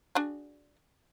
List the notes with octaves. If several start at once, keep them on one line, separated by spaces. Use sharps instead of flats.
D4 F#4 G#4